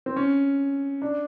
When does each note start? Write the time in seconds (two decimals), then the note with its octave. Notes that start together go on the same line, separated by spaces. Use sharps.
0.06 C4
0.16 C#4
1.02 D4